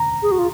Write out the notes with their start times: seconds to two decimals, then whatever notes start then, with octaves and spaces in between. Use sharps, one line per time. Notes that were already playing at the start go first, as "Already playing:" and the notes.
Already playing: A#5
0.23 G#4
0.31 F#4
0.39 F4